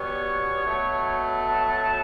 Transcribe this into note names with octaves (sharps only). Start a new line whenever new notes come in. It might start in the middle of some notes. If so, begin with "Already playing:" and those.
Already playing: B2 G3 B3 C#5
B2 F#3 A3
A5